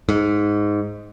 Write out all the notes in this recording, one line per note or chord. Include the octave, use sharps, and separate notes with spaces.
G#2